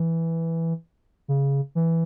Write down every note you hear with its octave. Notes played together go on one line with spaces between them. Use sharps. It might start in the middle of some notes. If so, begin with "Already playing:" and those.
Already playing: E3
C#3
E3